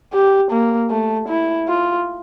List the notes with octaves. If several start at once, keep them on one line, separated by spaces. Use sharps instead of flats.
G4
A#3
A3
E4
F4